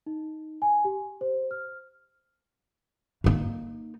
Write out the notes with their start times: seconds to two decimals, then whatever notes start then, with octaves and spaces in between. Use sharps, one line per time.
0.06 D#4
0.62 G#5
0.85 G4
1.21 C5
1.51 F6
3.24 A#3 D#4